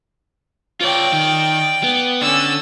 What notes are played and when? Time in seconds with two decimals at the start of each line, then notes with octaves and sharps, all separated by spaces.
0.81 F4 C#5 D5 G5
1.13 D#3
1.84 B3
2.22 D3 C#4 D5 E6